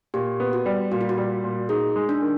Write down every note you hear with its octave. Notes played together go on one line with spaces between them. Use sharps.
A#2 G4
B3
F#4
G3
A#2 F#4
F4
F#4
G3
A#2
D#4 G#4
G#3
D4
D#3